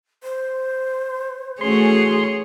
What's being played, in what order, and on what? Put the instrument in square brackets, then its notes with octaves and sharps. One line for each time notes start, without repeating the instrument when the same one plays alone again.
[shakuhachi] C5
[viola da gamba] E3 G#4 C#5 [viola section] A3 C#4 F#4 [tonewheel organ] C6